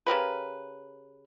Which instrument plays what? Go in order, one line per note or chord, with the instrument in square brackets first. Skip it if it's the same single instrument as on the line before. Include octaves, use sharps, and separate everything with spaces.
[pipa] C#3 G4 A#4 B4